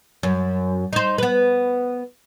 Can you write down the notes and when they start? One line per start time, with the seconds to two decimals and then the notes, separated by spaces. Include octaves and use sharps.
0.23 F#2
0.93 D#4 C5
1.18 B3 B4